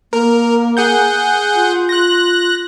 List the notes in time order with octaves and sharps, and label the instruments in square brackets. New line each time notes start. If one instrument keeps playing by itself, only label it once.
[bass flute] A#3 [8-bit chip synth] A#4
[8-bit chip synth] G#4 F#5 G6
[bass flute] F4
[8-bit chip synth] F#6 A#6